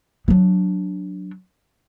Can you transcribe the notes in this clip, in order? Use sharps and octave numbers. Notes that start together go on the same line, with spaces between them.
F#3 D4